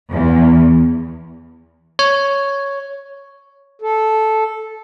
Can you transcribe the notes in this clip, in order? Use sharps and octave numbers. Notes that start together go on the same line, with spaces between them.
E2
C#5
A4